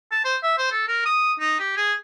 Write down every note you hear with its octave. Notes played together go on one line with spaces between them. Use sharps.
A5
C5
E5
C5
A4
A#4
D#6
D#4
G4
G#4